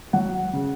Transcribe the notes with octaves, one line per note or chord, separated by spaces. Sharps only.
F#3 F#5
C#3